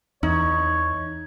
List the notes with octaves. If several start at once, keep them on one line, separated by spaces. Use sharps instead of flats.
E2 D#4 C#5